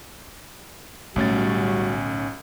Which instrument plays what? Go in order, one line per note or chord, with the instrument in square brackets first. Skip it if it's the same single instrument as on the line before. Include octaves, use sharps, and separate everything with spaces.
[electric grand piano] B1 C#4 A6 [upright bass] A2 D3 [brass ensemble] G3 F#4